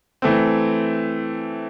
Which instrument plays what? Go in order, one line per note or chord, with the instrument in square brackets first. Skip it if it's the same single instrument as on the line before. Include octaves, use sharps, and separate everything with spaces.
[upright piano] E3 A3 C4